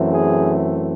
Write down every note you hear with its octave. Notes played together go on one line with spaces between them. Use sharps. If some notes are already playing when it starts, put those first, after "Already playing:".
Already playing: F#2 E3 A3 C4
G#4